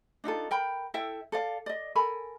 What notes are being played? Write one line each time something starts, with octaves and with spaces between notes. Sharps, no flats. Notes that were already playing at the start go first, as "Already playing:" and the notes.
D4 D#4 F4 A4
A#4 G5 B5
E4 A4 E5 G5
A4 D5 F5
D5 D#5
A4 A#4 G#5 B5